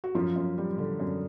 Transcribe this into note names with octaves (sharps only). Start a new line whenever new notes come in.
F#4
F#2 F3 F4
F#2
G3
D3
F#2